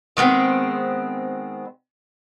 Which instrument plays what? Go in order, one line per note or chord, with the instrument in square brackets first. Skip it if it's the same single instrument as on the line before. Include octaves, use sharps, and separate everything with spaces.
[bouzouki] D#3 G#3 B3 C4